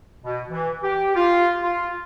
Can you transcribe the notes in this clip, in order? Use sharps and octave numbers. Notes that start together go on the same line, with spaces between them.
B2
E3
G4
F4
F4